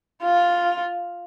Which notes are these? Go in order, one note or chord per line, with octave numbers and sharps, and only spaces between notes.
F4